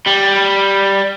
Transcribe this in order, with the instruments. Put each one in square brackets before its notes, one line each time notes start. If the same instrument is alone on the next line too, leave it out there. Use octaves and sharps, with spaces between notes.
[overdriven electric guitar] G3